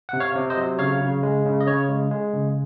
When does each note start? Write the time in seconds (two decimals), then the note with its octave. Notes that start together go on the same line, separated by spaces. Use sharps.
0.09 C3 F#5
0.20 C#5 F5
0.35 C3
0.50 C5 D#5
0.57 F#3
0.79 C#3 C#5 F5
1.01 C#3
1.23 G#3
1.46 C#3
1.61 D#5
1.67 C#3 C#5
1.89 G#3
2.11 G#3
2.34 C#3